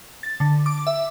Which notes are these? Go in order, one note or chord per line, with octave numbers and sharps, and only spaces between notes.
A6
D3
D6
E5